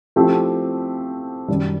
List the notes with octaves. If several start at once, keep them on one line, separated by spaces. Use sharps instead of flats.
F3 A3 C4 E4 G4
F#2 D#3 G3